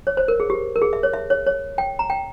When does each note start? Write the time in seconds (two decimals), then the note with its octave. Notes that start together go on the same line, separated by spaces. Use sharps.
0.07 C#5
0.17 C5
0.28 A#4
0.40 G#4
0.50 G4
0.76 A#4
0.82 G#4
0.93 E5
1.03 C#5
1.14 E5
1.30 C#5
1.46 C#5
1.78 G5
1.99 A#5
2.10 G5